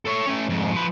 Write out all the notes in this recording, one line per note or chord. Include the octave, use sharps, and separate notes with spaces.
A4 C#5
A3 C#4
F2 G#2
F3 B4